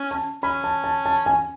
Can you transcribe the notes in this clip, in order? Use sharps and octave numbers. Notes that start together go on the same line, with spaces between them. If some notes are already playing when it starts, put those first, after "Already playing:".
Already playing: C#4
A5
C#4 B5
A5
A5
A5
G#5